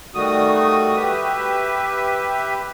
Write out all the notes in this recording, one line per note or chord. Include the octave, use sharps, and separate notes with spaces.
D#3 G3 A3 F#4 D#6
G4 B4 E5